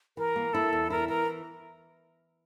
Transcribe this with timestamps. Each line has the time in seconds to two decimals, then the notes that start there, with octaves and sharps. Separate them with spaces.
0.17 E3 A#4
0.36 A#3
0.53 E4 A4
0.73 E2
0.90 E4 A#4
1.08 E3 A#4